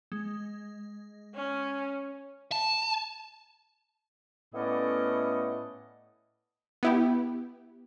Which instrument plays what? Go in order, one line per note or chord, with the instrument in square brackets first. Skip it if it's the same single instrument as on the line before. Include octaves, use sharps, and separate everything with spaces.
[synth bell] G#3
[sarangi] C#4
[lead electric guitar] A5
[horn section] A2 A3 B3 C#4 D5 D#5
[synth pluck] B3 E4 G4